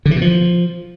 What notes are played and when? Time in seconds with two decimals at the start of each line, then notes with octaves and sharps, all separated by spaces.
0.06 D3
0.11 E3
0.16 B2
0.22 F3